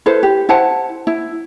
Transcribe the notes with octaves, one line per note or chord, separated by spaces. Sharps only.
E4 A4 B4 C5
G4
E4 C5 F#5 A5
E4